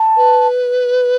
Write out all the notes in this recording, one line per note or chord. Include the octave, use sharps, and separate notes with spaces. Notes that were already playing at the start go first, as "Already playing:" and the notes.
Already playing: A5
B4